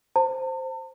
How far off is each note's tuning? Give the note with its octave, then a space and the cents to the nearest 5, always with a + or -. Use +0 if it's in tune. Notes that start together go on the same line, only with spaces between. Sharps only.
C5 +0 A5 +45